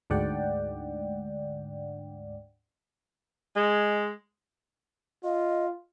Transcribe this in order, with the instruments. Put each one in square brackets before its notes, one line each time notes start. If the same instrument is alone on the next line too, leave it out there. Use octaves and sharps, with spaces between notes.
[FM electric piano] D2 G#2 D4 D5 F#5 G5
[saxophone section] G#3
[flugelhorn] F4 [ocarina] D#5